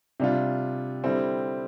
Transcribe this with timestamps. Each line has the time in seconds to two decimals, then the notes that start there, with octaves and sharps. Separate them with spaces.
0.20 C3 G3 D4 F4
1.04 D3 G3 C4 E4